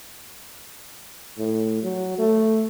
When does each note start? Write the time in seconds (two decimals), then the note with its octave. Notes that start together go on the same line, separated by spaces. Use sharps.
1.38 A2
1.83 F#3
2.18 A3